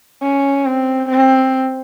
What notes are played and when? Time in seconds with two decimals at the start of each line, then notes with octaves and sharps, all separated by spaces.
0.22 C#4
0.66 C4
1.09 C4